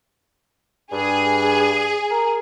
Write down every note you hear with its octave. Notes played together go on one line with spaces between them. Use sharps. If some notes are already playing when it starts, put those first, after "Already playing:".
G2 G#4
A#4